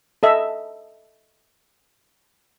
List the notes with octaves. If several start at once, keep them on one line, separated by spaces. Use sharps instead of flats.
A4 D#5 E5